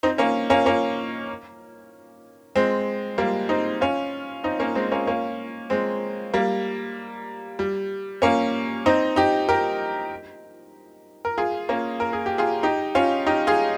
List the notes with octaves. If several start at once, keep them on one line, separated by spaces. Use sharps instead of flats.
C4 D#4
A#3 C#4
A#3 C#4
A#3 C#4
G#3 C4
G3 A#3
C4 D#4
C#4 F4
C4 D#4
A#3 C#4
G#3 C4
A#3 C#4
A#3 C#4
G#3 C4
G3 A#3
G3
A#3 C#4
C4 D#4
D#4 G4
G4 A#4
A#4
F4 G#4
A#3 C#4
A#4
G#4
G4
F4 G#4
D#4 G4
C#4 F4
D#4 G4
F4 G#4